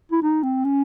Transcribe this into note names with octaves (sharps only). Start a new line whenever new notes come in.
E4
D#4
C4
C#4